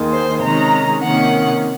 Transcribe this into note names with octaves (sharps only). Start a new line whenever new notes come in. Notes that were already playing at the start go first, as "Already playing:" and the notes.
Already playing: D#2 D#3 G#3
C5
C3 D#3 G#3 C#4 A#5
C3 D#3 A#3 C#4 F#5